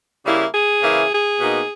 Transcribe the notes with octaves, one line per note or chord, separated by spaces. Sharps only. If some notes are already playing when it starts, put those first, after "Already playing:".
C#3 G3 A#3 E4
G#4
C#3 E3 A#3 E4
G#4
B2 A#3 D#4